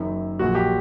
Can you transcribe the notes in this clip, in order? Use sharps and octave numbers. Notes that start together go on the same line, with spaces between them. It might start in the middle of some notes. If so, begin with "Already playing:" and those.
Already playing: F#1 F#2 D#3
A#1 A#2 F#3 F#4
G4